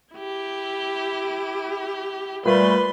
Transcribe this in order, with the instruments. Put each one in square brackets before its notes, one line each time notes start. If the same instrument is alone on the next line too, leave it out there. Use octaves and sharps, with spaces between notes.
[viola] E4 G4
[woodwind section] A#2 G3 A3 [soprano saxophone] B4 [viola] C6